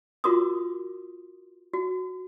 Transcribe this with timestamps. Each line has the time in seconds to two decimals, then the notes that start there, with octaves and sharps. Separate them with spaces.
0.24 F4 F#4 A#4 C6 D6 D#6
1.74 F#4